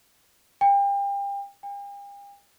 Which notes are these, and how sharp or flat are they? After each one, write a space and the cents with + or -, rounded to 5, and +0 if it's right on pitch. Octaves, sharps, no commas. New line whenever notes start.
G5 +35
G5 +45